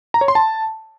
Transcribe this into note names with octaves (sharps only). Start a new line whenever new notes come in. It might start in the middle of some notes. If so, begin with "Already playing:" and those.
A#5
C#5
C6
A5